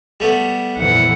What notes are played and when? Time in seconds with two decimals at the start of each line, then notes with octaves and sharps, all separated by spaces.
0.20 G3 A3 B3
0.78 F2 A#2 E3 F#5